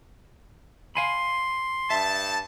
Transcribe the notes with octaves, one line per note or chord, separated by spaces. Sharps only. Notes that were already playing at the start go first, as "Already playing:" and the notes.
F5 G#5 B5 C6
G2 E5 A5